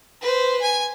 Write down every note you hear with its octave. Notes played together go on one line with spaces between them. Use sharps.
B4 C5
G#5